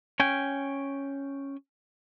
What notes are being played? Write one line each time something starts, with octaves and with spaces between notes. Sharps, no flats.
C#4 G5 G#5